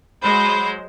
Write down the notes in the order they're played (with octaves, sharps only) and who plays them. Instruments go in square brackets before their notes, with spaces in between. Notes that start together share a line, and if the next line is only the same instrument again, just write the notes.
[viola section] F#3 G#3 C5 [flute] B5